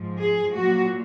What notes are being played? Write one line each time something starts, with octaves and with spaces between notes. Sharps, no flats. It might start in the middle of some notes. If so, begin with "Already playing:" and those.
Already playing: G#2 F3
G#4
A#2 F#3 F#4